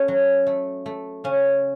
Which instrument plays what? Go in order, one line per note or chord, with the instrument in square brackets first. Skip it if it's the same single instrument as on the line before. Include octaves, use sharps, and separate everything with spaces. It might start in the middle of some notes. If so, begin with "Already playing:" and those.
Already playing: [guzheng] A3 C#4
F#3
A3
A3
C#3 C#4